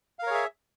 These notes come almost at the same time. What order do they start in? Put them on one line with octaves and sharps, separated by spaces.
F5 A#4 C#5 G#4 E5